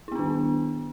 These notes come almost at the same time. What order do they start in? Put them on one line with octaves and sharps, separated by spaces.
E4 B3 D4 D#3